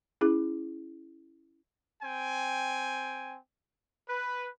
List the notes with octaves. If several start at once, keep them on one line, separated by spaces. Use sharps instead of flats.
C#4 E4 G#4
C4 G5 G#5
B4